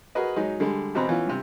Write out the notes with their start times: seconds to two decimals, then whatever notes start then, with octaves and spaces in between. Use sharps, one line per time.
0.15 F#4 G#4 A#4 B4 D#5
0.36 G#2 F#3 D#4
0.60 D3 G3 G#3
0.95 E2 B2 C4 A#5
1.09 E3 B3 C#4 F4
1.27 G2 C3